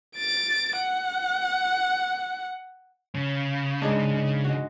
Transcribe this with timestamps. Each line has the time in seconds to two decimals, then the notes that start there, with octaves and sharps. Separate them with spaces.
0.17 A6 D7
0.79 F#5
3.15 C#3
3.82 G#2 G#3 D4
4.44 G#3 F#4